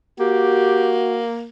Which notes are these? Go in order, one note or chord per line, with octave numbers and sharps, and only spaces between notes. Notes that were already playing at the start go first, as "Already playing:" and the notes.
A#3 F#4 G4